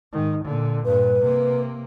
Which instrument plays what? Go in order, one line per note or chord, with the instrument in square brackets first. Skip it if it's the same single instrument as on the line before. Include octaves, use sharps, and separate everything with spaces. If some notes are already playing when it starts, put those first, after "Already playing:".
[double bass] G#2 D#3
A#2 D3
[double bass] G2 A#2 [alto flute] B4
[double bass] C3 A#3